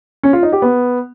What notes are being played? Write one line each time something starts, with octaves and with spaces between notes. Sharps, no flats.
C#4
F4
D#4
G4
B3